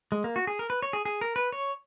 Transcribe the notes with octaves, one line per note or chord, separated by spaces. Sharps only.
G#3
A#3
F#4
G#4
A#4
B4
C#5
G#4
G#4
A#4
B4
C#5